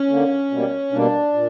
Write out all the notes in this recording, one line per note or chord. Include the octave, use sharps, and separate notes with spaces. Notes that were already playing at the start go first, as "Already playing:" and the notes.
Already playing: C#4
D3 A#3
B2 G3 A#3
B2 G3 A#3 D4
A#2